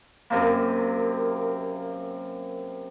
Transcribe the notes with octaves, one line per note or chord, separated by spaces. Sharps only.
F#2 C3 A#3